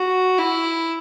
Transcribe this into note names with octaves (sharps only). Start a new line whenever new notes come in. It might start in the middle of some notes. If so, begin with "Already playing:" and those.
Already playing: F#4
E4